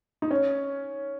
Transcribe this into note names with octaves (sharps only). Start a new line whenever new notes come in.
D#4
C#4